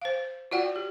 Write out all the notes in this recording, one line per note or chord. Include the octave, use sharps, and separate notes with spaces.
C5 F5
F4 F#4 D5 F#5 G5
G4